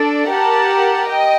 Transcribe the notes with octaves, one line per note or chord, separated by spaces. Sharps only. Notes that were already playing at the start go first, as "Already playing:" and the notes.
Already playing: D4 A4 D5
G4 A#4 F#5 A5
D#5 G5